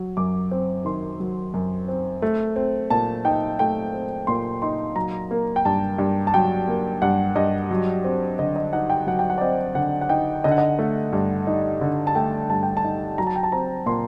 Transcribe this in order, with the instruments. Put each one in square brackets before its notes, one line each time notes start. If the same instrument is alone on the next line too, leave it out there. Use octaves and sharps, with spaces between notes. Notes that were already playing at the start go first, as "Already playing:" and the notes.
Already playing: [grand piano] F#3
F#2 D6
C4
D#3 C6
F#3
F#2
C4
A3
C4
A#2 A5
D#4 G5
A3 G5
C4
A#2 C6
D#4 C6
F#3 A#5
A#3
G5
G2 A5
G2
A5
F#3 G5
A#3
G2 F#5
G2 D#5
F#3
C4
D3 D#5
D#5
D#4 F#5
G5
F#3 F#5
G5
F#5
D5
C4 D#5
D3 F#5
F#5
D#4 G5
D3 D#5
F#5
D#5
A3
G2
D#4
D3
A5
A3 G5
G2 A5
G5
A5
D#4
F#3 A#5
A5
G5
A5
C4 A#5
A#2 C6